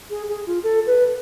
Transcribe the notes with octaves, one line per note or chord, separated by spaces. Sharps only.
G#4
G#4
F4
A4
B4